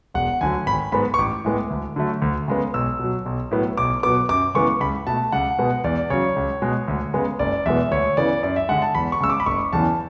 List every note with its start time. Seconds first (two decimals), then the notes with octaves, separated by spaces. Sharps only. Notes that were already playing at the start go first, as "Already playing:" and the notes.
0.14 E1 F#5
0.41 D2 D3 F#3 G#5
0.67 G#1 B5
0.92 G#2 G#3 B3 B5
1.14 C#6
1.18 A1 D6
1.45 A2 G#3 B3
1.70 D2
1.96 D3 F#3 A3
2.22 D2
2.48 C#3 G#3 B3
2.74 B1 E6
2.99 B2 F#3
3.26 B1
3.51 A2 F#3 B3
3.77 B1 D6
4.03 B2 F#3 B3 D6
4.29 F#2 D6
4.55 C#3 E3 G#3 B3 C#6
4.80 C#2 B5
5.07 B2 A3 A5
5.32 C#2 F#5
5.58 B2 G#3 B3
5.84 E2 D5
6.10 C#3 F#3 C#5
6.36 C#2
6.62 B2 G#3
6.88 D2
7.14 C#3 G#3 B3
7.39 F#1 D5
7.65 E2 B2 G#3 B3 E5
7.91 D2 C#5
8.17 C#3 E3 B3 D5
8.43 F#2 D5
8.56 E5
8.69 D3 G#3 F#5
8.82 A5
8.95 E2 B5
9.12 C#6
9.20 C#3 G#3 E6
9.30 D6
9.40 B5
9.46 F#1 C#6
9.73 E2 C#3 E3 A5